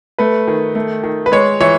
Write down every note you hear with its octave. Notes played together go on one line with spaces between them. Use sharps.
A3 B4
D#3
A3
D#3
B4
G#3 C#5
E3 C#5